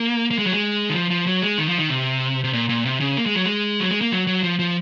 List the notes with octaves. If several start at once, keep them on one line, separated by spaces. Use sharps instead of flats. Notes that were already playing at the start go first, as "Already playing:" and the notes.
Already playing: A#3
A#3
G#3
F#3
G#3
D#3
F3
F3
F#3
G#3
D#3
F3
D#3
C3
C3
A#2
A#2
C3
C#3
A#3
G#3
F#3
G#3
F#3
G#3
A#3
F#3
F#3
F3
F3